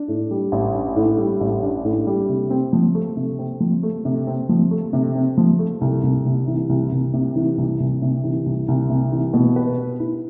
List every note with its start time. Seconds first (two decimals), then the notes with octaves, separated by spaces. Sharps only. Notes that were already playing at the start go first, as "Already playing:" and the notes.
Already playing: D4
0.08 A2
0.31 G3
0.52 A1
0.74 D4
0.96 A2
1.18 G3
1.41 A1
1.63 D4
1.85 A2
2.07 G3
2.29 C3
2.50 C4
2.73 F3
2.95 A3
3.17 C3
3.39 C4
3.60 F3
3.83 A3
4.05 C3
4.27 C4
4.49 F3
4.71 A3
4.93 C3
5.15 C4
5.38 F3
5.59 A3
5.81 C2
6.03 C2
6.25 C3
6.48 E3
6.69 C2
6.92 C2
7.13 C3
7.36 E3
7.58 C2
7.80 C2
8.02 C3
8.24 E3
8.46 C2
8.68 C2
8.89 C3
9.12 E3
9.34 B2
9.56 B4
9.78 B3
10.00 E4